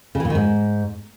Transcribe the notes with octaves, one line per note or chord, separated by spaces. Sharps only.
C#3
E3
A#2
D#3
G#2